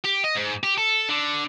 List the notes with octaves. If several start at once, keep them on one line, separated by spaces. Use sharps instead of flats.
G4
D#5
G#2
G4
A4
D3